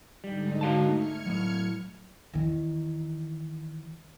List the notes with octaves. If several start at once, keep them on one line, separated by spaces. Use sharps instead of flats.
G#2 D3 G3 D#4
F#4 F5 A5
A3 F6 G#6 C#7
A2 F#3
E2 D#3